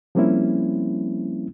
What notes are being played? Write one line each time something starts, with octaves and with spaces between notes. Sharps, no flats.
F3 G3 A#3 C4 C#4 E4